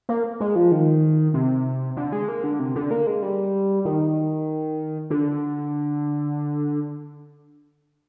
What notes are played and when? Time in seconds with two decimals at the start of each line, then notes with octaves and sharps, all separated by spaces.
0.09 A#3
0.40 G#3
0.56 F3
0.72 D#3
1.34 C3
1.97 D3
2.12 G#3
2.28 A#3
2.44 D3
2.59 C3
2.75 D3
2.91 A#3
3.07 G#3
3.23 G3
3.85 D#3
5.10 D3